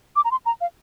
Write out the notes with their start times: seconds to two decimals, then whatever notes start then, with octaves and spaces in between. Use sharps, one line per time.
0.16 D6
0.25 A#5
0.31 C6
0.46 A#5
0.61 F5